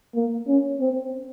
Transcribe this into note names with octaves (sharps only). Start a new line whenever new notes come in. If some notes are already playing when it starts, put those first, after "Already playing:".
A#3
C#4
C4